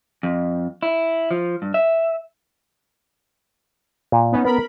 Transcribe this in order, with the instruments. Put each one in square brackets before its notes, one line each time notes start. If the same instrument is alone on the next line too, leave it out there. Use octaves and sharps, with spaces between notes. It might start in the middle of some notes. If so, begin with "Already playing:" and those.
[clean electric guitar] F2
E4
F3
G2
E5
[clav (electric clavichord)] A#2
[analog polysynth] B3 C#4 D#4
[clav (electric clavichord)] B3 [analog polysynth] A#4 B5